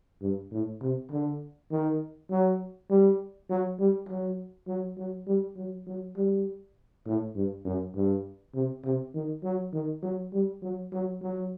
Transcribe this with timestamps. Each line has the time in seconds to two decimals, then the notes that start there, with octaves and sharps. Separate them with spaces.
0.22 G2
0.52 A2
0.81 C3
1.11 D3
1.71 D#3
2.31 F#3
2.90 G3
3.50 F#3
3.80 G3
4.09 F#3
4.68 F#3
4.98 F#3
5.27 G3
5.57 F#3
5.87 F#3
6.17 G3
7.06 A2
7.36 G2
7.65 F#2
7.96 G2
8.54 C3
8.84 C3
9.15 D#3
9.44 F#3
9.73 D#3
10.03 F#3
10.33 G3
10.62 F#3
10.93 F#3
11.22 F#3